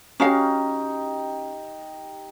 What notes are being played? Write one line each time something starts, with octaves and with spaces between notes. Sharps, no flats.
C#4 D#4 F#4 G4 F5